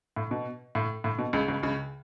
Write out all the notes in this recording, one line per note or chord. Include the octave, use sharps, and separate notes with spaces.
A2
B2
A2
A2
B2
C#2 C#3
C#2 C#3
C#2 C#3